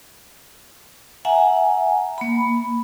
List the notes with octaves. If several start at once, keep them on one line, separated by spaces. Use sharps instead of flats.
E5 F#5 G#5 A#5
A#3 B5